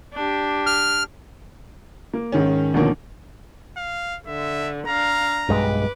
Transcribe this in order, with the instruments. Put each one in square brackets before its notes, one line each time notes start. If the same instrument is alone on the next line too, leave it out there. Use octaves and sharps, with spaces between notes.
[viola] D4 G4
[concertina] F6
[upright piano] A#3
G#2 D#3 C#4
D2 B2 D#3 F3 A#3 C#4
[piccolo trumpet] F5
[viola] D3 [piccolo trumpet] E5
[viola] D4 F5 [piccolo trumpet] A#5
[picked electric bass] B1 G2 G#3 [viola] B4 D6